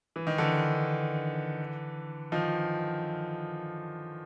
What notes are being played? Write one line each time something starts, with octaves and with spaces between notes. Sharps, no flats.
E3
D#3
D3 E3
D#3 F3